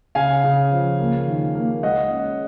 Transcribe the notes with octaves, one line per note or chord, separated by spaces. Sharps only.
C#3 F5 G#5
C#3
F3
A#3
D#3
A#3
G#3 D#5 F#5
C#4